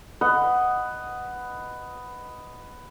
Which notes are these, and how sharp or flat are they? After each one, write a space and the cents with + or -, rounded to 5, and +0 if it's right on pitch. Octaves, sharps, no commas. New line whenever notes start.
B4 +10 D#5 +0 F#5 +0